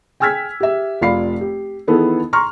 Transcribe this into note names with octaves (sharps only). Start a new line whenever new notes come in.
G5 G#5 E6 F6 G#6 B6
G4 E5
F1 F4 D5 F5 B5 C7
G4
D#3 E3 B3 G#4 A4
A#5 C6 C#6 F6